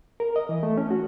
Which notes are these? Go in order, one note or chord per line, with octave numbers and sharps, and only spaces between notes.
A#4
D#5
E3
A3
C#4
F#4